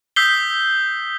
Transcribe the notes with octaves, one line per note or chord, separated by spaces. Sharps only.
D#6 E6 G6 B6 C7 G7